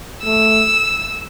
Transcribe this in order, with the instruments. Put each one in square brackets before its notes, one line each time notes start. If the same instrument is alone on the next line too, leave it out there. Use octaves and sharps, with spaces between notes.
[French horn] A3 [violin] E6